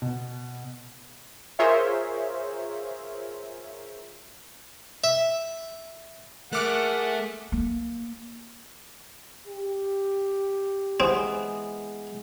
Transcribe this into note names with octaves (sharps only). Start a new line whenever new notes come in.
B2
F4 G#4 A#4 C5 C#5 E5
E5
A3 G#4 A#4 E5 F#5 D6 F6 F#6
A#3
G4
E3 G#3 B3 C4